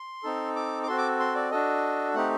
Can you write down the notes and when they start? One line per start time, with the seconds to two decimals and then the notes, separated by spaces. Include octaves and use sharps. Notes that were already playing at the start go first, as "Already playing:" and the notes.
Already playing: C6
0.23 C4 D#4 A4
0.56 D6
0.83 D6
0.87 C4 F#4 A4 C6
0.98 D6
1.19 C6
1.35 D5
1.51 D4 F#4 A4 D#5
2.14 A3 C4 D#4 G4 F#5